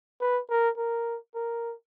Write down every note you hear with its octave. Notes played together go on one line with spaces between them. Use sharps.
B4
A#4
A#4
A#4